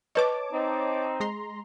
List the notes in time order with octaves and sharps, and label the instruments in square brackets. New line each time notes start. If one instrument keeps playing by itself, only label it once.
[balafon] B4 D#5 [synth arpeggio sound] C#5 A5 D6
[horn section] C4 D#4
[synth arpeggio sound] G#3 A#5 C6